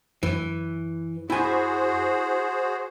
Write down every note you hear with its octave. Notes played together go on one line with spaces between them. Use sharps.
F#2 E3
E4 F#4 G#4 C5 G#5